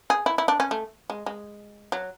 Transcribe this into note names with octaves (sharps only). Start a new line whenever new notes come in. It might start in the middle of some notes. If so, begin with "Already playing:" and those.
G#4
E4
E4
D4
C#4
A3
G#3
G#3
F#3